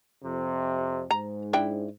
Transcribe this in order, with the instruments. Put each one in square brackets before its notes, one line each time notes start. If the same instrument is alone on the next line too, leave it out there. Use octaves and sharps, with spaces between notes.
[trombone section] F2 C3
[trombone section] G#2 [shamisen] A#5
[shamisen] D4 E4 G5